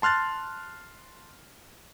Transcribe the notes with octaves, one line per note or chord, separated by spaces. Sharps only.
A5 C6 F6 F#6 A6